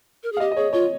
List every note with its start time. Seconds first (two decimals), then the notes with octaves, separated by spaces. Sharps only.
0.23 A#4
0.32 G#4
0.37 F5
0.40 G4 D#5
0.51 D#5
0.57 G#4 C#5
0.73 F4 C#5